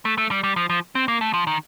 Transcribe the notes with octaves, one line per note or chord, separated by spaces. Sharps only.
A3
A3
G3
G3
F3
F3
C4
A#3
A3
F3
D#3